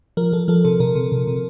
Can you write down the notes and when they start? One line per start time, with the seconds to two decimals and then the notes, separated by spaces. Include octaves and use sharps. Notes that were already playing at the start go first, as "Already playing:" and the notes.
0.17 F3 A#4
0.32 F3 A4
0.48 F3 A4
0.64 C3 A4
0.80 C3 A#4
0.95 C3
1.12 C3
1.27 C3